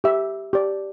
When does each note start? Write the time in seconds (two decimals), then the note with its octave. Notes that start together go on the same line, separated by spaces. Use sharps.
0.04 G4 E5
0.53 G4 D5